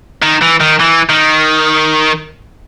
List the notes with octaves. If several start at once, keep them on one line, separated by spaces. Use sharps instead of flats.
D#3
E3
D#3
E3
D#3